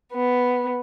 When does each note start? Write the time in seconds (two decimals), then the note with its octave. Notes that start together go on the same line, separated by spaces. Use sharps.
0.13 B3